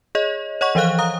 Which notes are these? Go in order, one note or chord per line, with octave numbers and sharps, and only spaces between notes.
G#4 C#5 D#5
C#5 D#5 F#5 C#6
E3 F3 C5 F5 F#6
F5 A#5 D#6